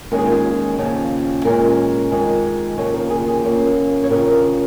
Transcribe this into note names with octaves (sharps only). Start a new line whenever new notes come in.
D#2 D#3 G#3 C#4 A#4
G#4
F4
G#4
D#2 C#3 F3
A#2 G#3 C#4 A#4
F2 D#3 G#3
D#2 C#3 F3 A#3 C#5
A#4
G#4
F4
G#4
C#3 A#3 C#4 F4
C#5
F2 C#3 F3 A#4